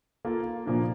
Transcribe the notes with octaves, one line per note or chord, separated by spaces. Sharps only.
A#3 F4 A4
A#2 F3 A#3 D4